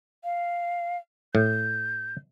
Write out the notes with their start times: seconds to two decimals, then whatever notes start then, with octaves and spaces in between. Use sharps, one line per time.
0.24 F5
1.35 A2 G6